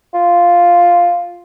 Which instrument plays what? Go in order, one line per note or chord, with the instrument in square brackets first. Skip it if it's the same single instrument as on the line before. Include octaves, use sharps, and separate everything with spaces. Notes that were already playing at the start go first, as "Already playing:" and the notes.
[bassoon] F4